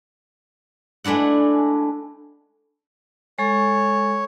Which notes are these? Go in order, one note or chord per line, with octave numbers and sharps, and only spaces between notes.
G#3 A3 D4 E4 F#5
G#3 A4 C#5